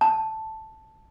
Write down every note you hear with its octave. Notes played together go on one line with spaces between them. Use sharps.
A5